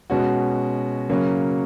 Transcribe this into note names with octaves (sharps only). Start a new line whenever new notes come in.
B2 G#3 C#4 F#4
C#3 F#3 A#3 C#4